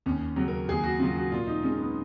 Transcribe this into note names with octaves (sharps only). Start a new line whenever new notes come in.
D#2 C#4
C#3 F#3
A#4
D#2 G#4
F#4
C#3 F#3 F4
F#4
A#2 F4
D#4
G#3 C#4
B3